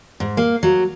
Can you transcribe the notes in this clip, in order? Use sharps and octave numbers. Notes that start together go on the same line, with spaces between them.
G#2
A#3
F#3